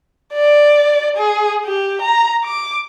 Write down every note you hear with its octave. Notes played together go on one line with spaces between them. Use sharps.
D5
G#4
G4
A#5
D6